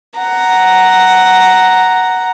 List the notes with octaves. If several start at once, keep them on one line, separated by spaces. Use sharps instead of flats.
F#5 A#5